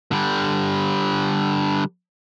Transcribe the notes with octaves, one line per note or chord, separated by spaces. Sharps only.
D3 G3